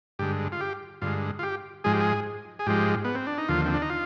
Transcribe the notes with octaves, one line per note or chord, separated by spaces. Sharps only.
G2 D3 G#3 G4
F4
G4
G2 D3 G#3 F4
F4
G4
G#2 F3 G#3 G#4
G4
G#4
G#4
G#2 F3 G#3 G4
B3
C4
D4
D#4
D#2 D3 F3 F4
C4
D4
D#4
F4